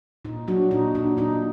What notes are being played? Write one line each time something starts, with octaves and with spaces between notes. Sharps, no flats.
A#2 D#4
F#3 D4 F#4
A#2 D#4
A#2 D4
A#2 D#4